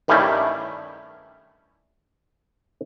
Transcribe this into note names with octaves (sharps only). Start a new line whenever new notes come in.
G2 D#3 G3 A3 C#4 E4